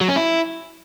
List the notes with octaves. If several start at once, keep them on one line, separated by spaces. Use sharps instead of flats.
F#3
C#4
E4